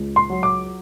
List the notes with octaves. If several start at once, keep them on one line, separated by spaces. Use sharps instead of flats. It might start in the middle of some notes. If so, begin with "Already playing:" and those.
Already playing: C#2
C6
F#3
D6